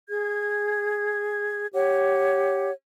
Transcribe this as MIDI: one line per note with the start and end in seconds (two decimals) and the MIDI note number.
0.09 1.67 68
0.09 1.67 92
1.74 2.72 67
1.74 2.72 73
1.74 2.72 78